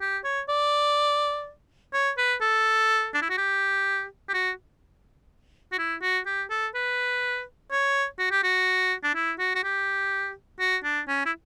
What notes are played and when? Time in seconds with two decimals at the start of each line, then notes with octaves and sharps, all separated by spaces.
0.01 G4
0.24 C#5
0.49 D5
1.94 C#5
2.18 B4
2.41 A4
3.14 D4
3.22 E4
3.30 F#4
3.37 G4
4.29 G4
4.34 F#4
5.72 F#4
5.78 E4
6.02 F#4
6.26 G4
6.50 A4
6.75 B4
7.71 C#5
8.19 F#4
8.31 G4
8.43 F#4
9.03 D4
9.15 E4
9.39 F#4
9.55 F#4
9.64 G4
10.60 F#4
10.84 D4
11.08 C#4
11.26 E4